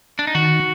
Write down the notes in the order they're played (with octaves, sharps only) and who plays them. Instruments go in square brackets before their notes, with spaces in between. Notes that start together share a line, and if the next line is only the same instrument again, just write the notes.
[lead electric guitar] D4
D#4
[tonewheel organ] D#3 [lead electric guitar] F#4